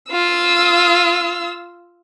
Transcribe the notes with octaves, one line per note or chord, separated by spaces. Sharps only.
F4 E6